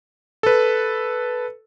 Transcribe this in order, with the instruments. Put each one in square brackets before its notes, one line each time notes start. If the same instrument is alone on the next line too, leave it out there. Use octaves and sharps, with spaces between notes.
[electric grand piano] A4 B4